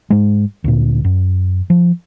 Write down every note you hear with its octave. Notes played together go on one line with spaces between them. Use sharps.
G#2 G#3
D2 A#2
F#2
F3